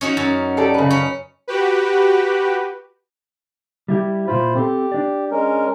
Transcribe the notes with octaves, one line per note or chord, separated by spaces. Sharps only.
C#4 D#4 F#4
F#2
G4 A4 D5
C#3 B4
C#4
F#4 G4 B4
G3 E4 G4
A#2 E4 F4 C5 B5
C4 G4 A4 C6
D4 D5
G#3 C#4 A#4